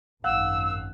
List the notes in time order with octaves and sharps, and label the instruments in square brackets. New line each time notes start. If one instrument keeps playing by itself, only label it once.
[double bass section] G#1 F#2 [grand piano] F5 F#5 F#6 [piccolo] E6